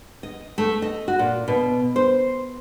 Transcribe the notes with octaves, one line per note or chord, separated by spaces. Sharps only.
D#5
A3
D#5
F#4
A#2
B2
C5